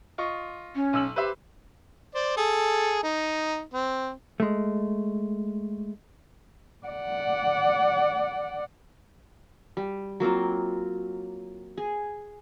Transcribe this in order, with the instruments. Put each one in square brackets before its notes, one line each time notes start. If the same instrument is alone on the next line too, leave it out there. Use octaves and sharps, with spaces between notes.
[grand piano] F4 D#5 C#6
[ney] C#4
[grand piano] B1 E6 F#7
[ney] G4 [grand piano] B4 C5 E5
[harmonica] C5 D5
G#4 A4
D#4
C4
[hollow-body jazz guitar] G#3 A3
[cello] D5 F#5
[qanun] G3
F#3 A#3 C4 F4
G#4